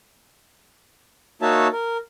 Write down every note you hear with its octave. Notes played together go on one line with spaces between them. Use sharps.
A#3 D#4 F#4 C#5 E5 A5
A#4